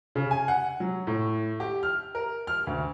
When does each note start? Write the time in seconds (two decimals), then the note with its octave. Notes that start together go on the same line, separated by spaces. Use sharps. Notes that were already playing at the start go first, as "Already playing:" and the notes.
0.15 C#3
0.31 G#5
0.48 F#5
0.80 F#3
1.07 A2
1.60 G4
1.83 F6
2.15 A#4
2.47 F6
2.67 D2